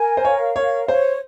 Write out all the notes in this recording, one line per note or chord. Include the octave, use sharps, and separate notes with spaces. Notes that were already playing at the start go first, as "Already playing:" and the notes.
Already playing: A#4 G#5
C5
C#5 F5
A#4 C#5
C5 C#5